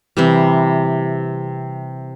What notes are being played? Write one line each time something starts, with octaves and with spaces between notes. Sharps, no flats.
C3 E3 G3